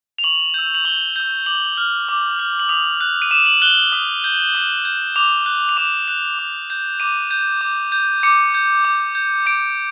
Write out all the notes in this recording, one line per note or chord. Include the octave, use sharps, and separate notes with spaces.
F7
C#6 F#7
E6 G6
F#7
C#6 G7
E6 G6
D6 F#7
F6
D6
F6
F#7
D#6 F7
F#6
D#7
D#6 E7
F#7
F#6 G7
D#6
G6
D#6
G6
D6 F7
F#6
F7
D6 E7
F#6
D6
G6
D6 D#7
G6
D6
G6
D6 C#7
G6
D6
G6
D6 D7